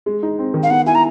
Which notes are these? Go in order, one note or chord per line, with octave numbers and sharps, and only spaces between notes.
G#3
D#4
C4
D#3
F5
B3 F#5
E4 G#5
A#5